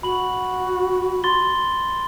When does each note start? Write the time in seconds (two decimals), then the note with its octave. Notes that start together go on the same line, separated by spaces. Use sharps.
0.03 F#4 B5 F#7
1.24 C6 A6 G7